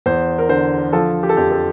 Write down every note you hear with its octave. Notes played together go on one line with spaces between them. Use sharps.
E2 C5
A#4
D3 C5
F3 A4
G4
A4
F2 G4
A4